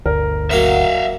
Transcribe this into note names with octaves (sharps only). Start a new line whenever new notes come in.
G1 D2 A#4
F#3 A#3 E5 F5